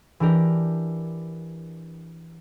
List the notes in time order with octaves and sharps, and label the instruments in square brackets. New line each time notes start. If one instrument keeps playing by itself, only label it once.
[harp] E3 D4 G4 A#4